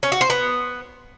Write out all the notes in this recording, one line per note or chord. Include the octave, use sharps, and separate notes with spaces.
C#4
F#4
C5
B3